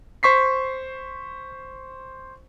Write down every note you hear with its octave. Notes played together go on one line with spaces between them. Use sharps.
C5 C#6 B6 C7